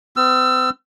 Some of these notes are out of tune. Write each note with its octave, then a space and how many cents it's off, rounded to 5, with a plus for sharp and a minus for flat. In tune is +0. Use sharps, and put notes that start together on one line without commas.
C4 -45 E6 +30